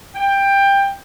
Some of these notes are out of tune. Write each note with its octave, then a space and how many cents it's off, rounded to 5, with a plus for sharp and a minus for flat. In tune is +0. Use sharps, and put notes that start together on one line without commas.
G5 +15